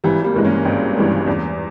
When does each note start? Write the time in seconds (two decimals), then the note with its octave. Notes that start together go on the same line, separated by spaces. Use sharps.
0.04 G#1 E3 G3
0.24 G3 A#3
0.34 G2 E3 G#3
0.45 A#3 C#4
0.65 G#1
0.97 G2 E3 G#3
1.27 E2